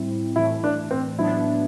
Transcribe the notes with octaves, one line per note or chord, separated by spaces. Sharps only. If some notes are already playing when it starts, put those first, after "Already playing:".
Already playing: A2 G3 C4 E4
A2 E3 A3 E4
D4
C4
A2 F#3 B3 D4 E4